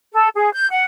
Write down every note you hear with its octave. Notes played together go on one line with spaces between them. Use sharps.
A4
G#4
G6
F#5